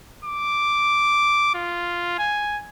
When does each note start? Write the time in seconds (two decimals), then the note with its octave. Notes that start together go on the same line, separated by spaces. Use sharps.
0.25 D6
1.55 F4
2.18 G#5